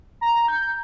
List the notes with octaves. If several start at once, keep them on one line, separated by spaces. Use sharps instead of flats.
A#5
G6